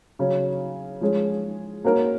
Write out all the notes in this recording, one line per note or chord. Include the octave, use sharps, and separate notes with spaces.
C#3 F#3 C#4
F3 G#3 C#4 G#4
A#3 C#4 F#4 A#4 C#5